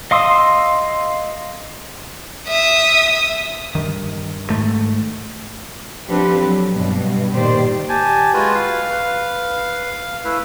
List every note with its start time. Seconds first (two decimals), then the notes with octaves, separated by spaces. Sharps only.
0.11 D#5 F5 C6 D#6 E6
2.47 E5 D#6
3.75 G2 D#3
4.49 G#2 A3
6.09 F3 C4 D4 G4 A4 B4
6.44 F#3
6.73 G2 B2
7.33 A#2 D#3 G4 C5 D5
7.89 G4 G#5 A5
8.34 G#3 F4 F#4 B4
8.55 F5
8.91 B4
10.24 A3 E4 B4